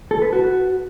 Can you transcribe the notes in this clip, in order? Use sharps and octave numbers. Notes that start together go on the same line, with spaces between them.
A4
B4
F#4